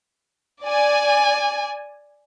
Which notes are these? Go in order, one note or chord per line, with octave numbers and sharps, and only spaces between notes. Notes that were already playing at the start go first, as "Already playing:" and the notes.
D5 G#5